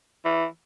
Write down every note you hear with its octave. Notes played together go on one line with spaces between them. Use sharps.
E3